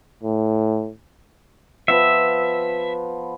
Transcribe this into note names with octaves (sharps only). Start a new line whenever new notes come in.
A2
F3 B3 E5